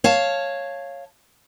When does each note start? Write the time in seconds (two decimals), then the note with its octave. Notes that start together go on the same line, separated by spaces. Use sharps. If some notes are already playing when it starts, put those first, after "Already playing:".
0.04 C#5 F5 A5